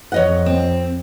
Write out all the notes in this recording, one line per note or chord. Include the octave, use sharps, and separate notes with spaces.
F2 C#5 D#5 F#5
C4